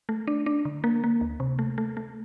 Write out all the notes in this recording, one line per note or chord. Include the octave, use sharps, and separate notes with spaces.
A3
D4
D4
D3
A#3
A#3
D2
C3
A3
A3
A3